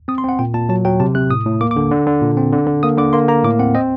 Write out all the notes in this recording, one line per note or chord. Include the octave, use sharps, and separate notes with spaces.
C4 D#6
C6
C4 F#5
A#2 G5
A#2 A5
F#3 A5
F#3 G5
C3 A5
C3 F#6
A2 D#6
A2
A#3 D6
D6
D3
D3
D3
A#2
C4
D3
D3
A#3 D#6
D3 D6
A#3 C6
A#3 A#5
A2 D6
C4 F#5
C4 D#5